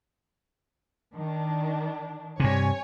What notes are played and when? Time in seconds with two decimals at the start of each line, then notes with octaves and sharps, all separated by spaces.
1.15 D#3 D4
2.40 G2 C3 C#5 G#5